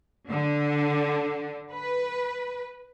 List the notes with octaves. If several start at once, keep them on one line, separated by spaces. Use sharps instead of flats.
D3
B4